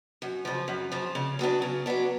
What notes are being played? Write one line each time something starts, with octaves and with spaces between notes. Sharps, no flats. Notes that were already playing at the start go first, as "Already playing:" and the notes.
F#2
C#3 F3
F#2
C#3 F3
C#3
F#3 B3 D4
C#3
F#3 B3 D4